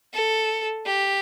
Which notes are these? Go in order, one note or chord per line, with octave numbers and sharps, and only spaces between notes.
A4
G4